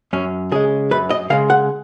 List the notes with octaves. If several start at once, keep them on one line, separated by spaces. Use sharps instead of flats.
F#2 C#4
C#3 G#3 G#4
F#2 B4
D#5
C#3 G#3 F5
F#5